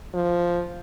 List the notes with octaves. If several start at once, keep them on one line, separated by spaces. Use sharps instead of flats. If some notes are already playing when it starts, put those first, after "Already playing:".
F3